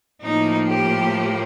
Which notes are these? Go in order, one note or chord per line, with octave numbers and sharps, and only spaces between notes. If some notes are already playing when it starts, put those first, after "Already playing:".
A2 F3 A#3 D#4
G4